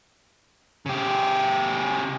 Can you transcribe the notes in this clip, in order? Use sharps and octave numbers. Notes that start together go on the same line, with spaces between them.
C#3 G4